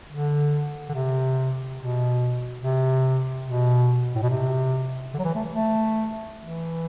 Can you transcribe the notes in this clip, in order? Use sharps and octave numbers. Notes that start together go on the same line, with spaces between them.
D3
D3
C3
B2
C3
B2
A2
B2
C3
D3
F#3
E3
A3
A3
E3